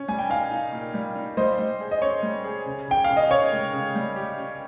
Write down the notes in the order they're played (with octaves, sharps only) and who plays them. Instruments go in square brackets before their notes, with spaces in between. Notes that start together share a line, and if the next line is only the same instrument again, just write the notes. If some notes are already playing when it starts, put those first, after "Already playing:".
Already playing: [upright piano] C#4
[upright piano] G3 [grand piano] G#5
[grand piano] G5
[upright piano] D#4 [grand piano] F5 G#5
[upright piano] D#4
A#2
G3
D#4
[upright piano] G3 [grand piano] C5 D#5
[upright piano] G3
G#4
[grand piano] D#5
[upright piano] C#4 [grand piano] C#5
[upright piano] G3
G#4
C#3
[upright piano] C#3 [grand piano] G5
[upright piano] C#3 [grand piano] F5
[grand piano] D#5
[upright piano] C#3 [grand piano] C#5
[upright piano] G#3
C#3
G3
G4
C#4